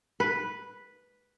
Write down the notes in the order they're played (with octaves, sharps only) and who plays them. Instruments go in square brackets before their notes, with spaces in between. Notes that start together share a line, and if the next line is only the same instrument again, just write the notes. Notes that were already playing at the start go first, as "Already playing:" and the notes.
[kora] B4